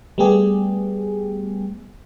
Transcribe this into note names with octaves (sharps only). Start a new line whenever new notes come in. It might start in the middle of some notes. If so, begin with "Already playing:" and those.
G3 A3 B3 G4 G#4